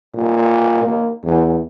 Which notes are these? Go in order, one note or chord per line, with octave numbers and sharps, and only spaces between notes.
A#2
A#3
E2